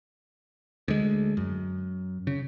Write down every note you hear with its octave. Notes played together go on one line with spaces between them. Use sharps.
D2 G#3
F#2
C#3